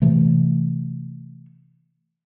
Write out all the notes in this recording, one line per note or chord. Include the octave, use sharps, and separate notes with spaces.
C3 E3 A3